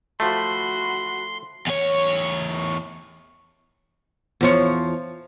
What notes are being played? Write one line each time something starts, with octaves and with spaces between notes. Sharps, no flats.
F3 A3 F#4 B5 C6
E2 C#5
E2 F3 C#5